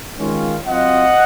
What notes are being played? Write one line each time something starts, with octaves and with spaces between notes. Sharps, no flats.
D#3 G#3 C#4 F4
F#3 C4 F4 D#5 F#5